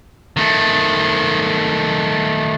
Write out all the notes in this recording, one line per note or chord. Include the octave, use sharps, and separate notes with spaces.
D#3 A3